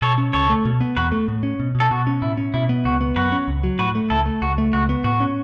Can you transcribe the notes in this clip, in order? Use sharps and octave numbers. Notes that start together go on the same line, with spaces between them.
B2 A4 C#5
C#4
C#2 A4 C#5
A3
B2
B3
E2 F#4 B4
A3
A2
C#4
B2
B2
A4
B2 F#4
C#4
A2 E4
C#4
B2 E4
B3
C#2 F#4
B3
F#2 F#4 B4
C#4
C#2
F#3
A2 F#4 B4
A3
C#2 E4 A4
A3
C#2 F#4
A3
C#2 F#4
B3
A2 F#4
C#4